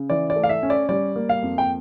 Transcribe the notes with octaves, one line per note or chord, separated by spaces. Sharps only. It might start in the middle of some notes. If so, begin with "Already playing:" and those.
Already playing: C#3
E3 D5
D5
A3
F5
E5
C#4
D5
G3 D5
A#3
F5
F2
G5